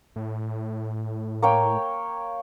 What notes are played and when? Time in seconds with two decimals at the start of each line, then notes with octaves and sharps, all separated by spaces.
0.16 A2
1.42 A#3 C#5 G5